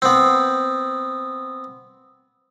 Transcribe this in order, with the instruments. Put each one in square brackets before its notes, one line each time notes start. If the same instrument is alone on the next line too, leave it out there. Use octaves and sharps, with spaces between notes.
[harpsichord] B3 C4